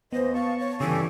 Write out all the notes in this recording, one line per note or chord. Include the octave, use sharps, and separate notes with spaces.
D#2 E3 B3 C5 D#5
F5 A5 C#6
C#5
G2 C#3 E3 G4 A4 G#5